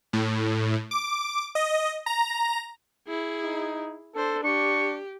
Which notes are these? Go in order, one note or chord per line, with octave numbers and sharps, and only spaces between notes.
A2
D6
D#5
A#5
E4 G#4
D#4
D4 A4 C5
D4 G4 C#6